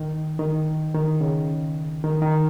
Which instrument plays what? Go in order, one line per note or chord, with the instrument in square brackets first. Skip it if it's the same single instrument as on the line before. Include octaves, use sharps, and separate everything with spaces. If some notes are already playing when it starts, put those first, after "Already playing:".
Already playing: [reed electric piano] D#3
D#3
D#3
C#3
D#3
D#3